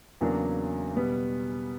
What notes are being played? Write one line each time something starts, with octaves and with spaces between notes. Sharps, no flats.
E2 C#3 F#3 A#3 D4
B2 G3 B3